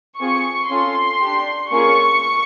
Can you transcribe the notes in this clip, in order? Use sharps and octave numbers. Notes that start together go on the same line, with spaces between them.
C4 F4 G#4 C#6
C#4 F4 A4 C6
D4 G4
A#3 C#4 F4 G#4 C#6